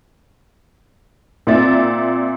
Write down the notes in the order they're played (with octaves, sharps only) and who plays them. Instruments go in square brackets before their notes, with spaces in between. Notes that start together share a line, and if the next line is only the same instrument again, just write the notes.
[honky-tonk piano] A#2 C4 D5 E5 A6